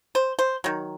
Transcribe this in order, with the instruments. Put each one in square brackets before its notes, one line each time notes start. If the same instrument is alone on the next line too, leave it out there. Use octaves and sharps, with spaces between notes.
[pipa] C5
C5
D#3 F#3